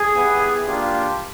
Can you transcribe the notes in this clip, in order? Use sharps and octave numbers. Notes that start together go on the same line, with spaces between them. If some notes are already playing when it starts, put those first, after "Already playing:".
Already playing: G#4
B3 E4 G4
A#3 D4 F4 G4